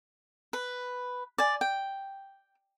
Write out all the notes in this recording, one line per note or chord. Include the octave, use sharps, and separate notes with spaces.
B4
D5 G#5
G5